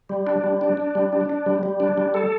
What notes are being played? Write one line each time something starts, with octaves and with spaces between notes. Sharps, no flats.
G3
D4
G3
D4
D4
G3
D4
D4
G3
G3
D4
G3
A4